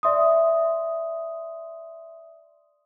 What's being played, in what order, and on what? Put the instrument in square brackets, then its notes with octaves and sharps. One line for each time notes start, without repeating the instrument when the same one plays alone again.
[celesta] D5 E5 C6 D#6